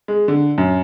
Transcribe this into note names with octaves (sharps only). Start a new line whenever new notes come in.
G#3
D3
F#2